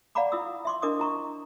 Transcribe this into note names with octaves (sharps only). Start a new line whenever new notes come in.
D5 F5 F#5 A#5 B5 D6
E4 F4 D#6 E6
E5 C6 D6
D4 E4 A#4 D#5 D6 D#6
E4 A#5 C#6